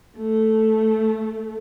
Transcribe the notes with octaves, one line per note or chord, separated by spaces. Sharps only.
A3